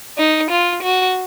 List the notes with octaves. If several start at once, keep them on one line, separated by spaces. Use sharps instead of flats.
D#4
F4
F#4